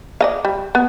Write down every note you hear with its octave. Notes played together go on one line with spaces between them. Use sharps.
D5 D#5 F5
G3
B3